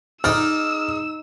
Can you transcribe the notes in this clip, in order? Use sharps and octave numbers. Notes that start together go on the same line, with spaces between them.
D#4 G#4 D5 G5 E6 F6